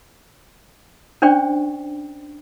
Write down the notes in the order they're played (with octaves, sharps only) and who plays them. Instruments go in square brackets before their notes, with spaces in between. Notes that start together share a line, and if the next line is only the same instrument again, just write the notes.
[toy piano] C#4 D4 C5 D5 G5 C#6